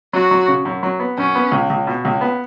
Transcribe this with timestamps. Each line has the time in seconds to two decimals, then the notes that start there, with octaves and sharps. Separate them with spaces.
0.13 F#3 F#4
0.31 F#3
0.48 C#3
0.65 F#2
0.83 F#3
1.00 B3
1.18 F#2 C#4
1.35 B3
1.52 C#2
1.70 C#2
1.87 B2
2.05 C#2
2.21 B3